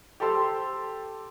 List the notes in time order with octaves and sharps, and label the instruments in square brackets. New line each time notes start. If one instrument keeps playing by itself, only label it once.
[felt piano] G4 A4 C5 A5 C6 E6